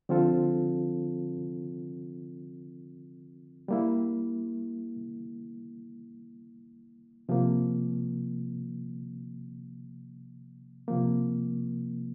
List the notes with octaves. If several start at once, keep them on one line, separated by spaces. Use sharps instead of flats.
D3 F3 C4 F4 A4
G3 A#3 E4
C3 F3 A#3
C3 F3 A#3